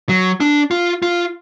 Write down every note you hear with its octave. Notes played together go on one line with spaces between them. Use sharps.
F#3
D4
F4
F4